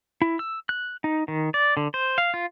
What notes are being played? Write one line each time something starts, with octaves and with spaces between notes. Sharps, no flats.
E4
E6
F#6
D#4
D#3
D5
D3
C5
F5
F4